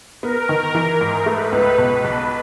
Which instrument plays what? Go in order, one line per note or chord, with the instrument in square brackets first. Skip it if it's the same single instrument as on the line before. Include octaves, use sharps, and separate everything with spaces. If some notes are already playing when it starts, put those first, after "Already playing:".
[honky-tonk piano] B3 [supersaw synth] A#4
[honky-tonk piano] D#3
E3
G#2
[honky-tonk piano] A3 [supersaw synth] B4
[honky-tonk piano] C#2
B2
B1